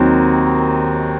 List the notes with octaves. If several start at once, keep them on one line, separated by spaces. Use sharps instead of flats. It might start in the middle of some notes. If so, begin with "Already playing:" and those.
Already playing: D#2 D#3 F#3 C4